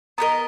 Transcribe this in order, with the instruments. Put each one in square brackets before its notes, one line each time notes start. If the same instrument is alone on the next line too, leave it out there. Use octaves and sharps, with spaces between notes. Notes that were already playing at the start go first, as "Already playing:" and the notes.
[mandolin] B3 D#4 A#4 D#5 [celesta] A#5